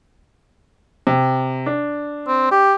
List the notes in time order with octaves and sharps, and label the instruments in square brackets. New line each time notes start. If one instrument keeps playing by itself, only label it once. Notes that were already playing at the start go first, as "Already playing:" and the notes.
[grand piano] C3
D4
[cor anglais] C4
G4